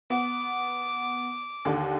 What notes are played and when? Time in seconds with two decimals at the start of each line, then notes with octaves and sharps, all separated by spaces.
0.10 B3 D6
1.65 D#2 D3